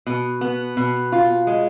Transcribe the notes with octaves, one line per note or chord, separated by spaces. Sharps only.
B2
B3
B2
F4
G#3